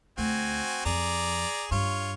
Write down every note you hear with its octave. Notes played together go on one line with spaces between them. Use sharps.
D2 C4 F#4 G#5
F2 G#4 D5 A#5
G2 F4 C#5